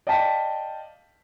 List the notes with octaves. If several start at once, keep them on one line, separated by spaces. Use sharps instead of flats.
D5 D#5 F5 G5 A5 B6